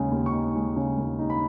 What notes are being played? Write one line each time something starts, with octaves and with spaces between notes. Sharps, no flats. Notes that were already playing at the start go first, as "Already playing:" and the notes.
Already playing: D#2 C#3 G#3 D#4
D#2
C#6
D#4
G#3
C#3
D#2
D#4
B5